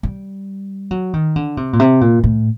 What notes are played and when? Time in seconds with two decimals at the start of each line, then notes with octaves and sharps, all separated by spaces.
0.03 G3
0.91 F#3
1.14 D#3
1.36 D3
1.57 C3
1.73 A#2
1.80 C3
2.01 A#2
2.24 A2